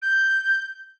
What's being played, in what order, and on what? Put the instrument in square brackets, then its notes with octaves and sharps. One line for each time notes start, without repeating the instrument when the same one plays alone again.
[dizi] G6